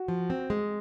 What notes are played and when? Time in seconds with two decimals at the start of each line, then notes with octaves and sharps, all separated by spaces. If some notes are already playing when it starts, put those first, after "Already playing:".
Already playing: F#4
0.08 F3
0.30 C4
0.50 G#3